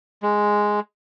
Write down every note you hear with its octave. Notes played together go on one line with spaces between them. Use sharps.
G#3